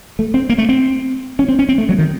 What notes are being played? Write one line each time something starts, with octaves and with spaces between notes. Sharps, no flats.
A3
C4
A#3
A3
C4
C#4
C4
C#4
C4
A3
F#3
D#3